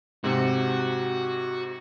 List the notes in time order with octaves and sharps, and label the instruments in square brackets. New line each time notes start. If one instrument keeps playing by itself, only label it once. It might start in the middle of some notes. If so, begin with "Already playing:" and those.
[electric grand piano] G#2 C3 [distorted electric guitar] F#4